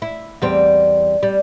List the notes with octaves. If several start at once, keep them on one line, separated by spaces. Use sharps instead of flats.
E4
E2 G3 C4
G3